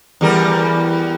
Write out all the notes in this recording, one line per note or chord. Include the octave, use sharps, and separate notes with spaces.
E2 G3 A#4